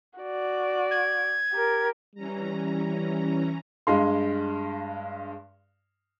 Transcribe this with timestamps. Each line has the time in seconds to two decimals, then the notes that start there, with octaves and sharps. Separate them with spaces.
0.19 F#4 D5
0.91 G#6
1.52 G4 A#4
2.15 E3 G3 C#4 A#5
3.87 G2 G#3 F5 C6